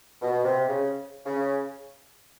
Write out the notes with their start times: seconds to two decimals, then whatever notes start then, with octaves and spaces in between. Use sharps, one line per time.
0.21 B2
0.44 C3
0.68 C#3
1.25 C#3